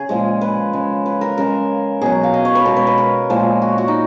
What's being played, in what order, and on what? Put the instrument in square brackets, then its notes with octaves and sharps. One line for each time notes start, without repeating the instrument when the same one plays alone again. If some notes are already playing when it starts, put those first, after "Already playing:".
Already playing: [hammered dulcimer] C#3 G#4
A#2 F3 G#3
B4
C#3 G#3
B4
A#4
C#3 G#3 A#4
B2 F#3 G#4
F5
D#5
C#5
B4
B2 G#3 A#4
B4
B4
A#4
A#2 F3 G#3
F#4
F#4
D#4